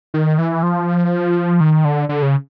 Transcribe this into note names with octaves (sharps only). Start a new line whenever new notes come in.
D#3
E3
F3
D#3
D3
D3
C#3